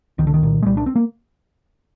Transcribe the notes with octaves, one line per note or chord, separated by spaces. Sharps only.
C2 D#3
D3
D#3
A#2
G#3
C2 G3
D4
C4
A#3